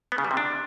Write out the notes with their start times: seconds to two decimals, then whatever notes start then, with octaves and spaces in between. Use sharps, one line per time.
0.12 B3
0.18 C#3
0.24 G3
0.31 C3
0.37 D4